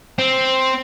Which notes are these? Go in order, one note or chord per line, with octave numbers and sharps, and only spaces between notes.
C4